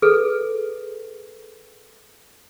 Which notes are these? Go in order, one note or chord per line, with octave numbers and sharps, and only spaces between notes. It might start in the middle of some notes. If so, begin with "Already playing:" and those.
G#4 A4 B4